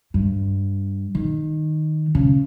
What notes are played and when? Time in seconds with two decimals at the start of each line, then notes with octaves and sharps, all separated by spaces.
0.14 G2
1.15 D#3
2.15 C#3